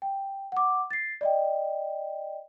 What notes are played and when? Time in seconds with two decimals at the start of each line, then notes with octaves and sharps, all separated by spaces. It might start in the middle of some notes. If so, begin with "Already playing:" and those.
0.02 G5
0.52 F#5 D6
0.91 A6 C7
1.21 D5 D#5 G5